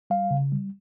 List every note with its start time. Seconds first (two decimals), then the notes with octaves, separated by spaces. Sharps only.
0.10 G3 F5
0.31 C#3
0.52 G3